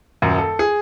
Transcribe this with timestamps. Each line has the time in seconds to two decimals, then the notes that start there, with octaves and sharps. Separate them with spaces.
0.22 D#1 F#2
0.38 A4
0.59 G#4